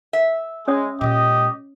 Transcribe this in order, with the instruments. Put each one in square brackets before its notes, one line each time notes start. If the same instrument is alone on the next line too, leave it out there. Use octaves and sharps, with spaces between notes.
[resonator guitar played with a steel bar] E5
[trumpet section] G#3 [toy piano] C#4 C#5 D#6
[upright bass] A#2 G#3 [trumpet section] G4 D#5